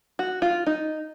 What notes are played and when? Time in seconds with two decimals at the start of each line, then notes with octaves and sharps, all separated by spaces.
0.19 F#4
0.42 F4
0.66 D#4